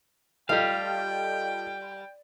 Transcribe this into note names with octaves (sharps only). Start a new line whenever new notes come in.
G3 F4 G4 A4 D#5 F5 G5